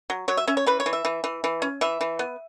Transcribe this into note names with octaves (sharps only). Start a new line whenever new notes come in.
F#3
F#3 C#5
E5
C#4 E5
C#5
E3 B4
C#5
E3
E5
E3
E3
E3
C#4
E3 E5
E3
B3